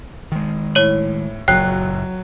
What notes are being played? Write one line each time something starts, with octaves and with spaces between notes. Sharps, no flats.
D#3 G#3
A2 C#5 D#7 F#7
F#1 A#2 F#3 G5 F#6